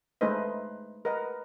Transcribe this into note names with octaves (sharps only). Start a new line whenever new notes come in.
G#3 A3 D#4 B4 C5 D#5
A#4 B4 D#5 F#5